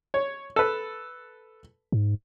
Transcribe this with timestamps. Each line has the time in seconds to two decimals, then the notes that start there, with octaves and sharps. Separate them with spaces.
0.14 C#5
0.56 A4 B4
1.92 G#2